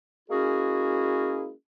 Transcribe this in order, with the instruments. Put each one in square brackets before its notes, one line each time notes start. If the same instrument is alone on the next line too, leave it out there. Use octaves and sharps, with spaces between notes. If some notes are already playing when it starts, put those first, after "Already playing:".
[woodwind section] G#3 A#3 C#4 E4 F#4 G#4